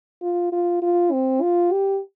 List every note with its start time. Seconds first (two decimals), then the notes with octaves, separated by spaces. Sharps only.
0.22 F4
0.52 F4
0.82 F4
1.12 C4
1.42 F4
1.72 G4